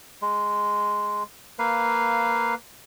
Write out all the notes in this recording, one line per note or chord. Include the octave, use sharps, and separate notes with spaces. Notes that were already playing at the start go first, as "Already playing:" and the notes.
G#3
A#3 B4 F5